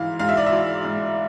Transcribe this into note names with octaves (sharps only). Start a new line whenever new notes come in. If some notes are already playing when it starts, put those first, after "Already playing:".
Already playing: G#2 E3 F5
G#2 F5
E5
D5
E5
E3
G#2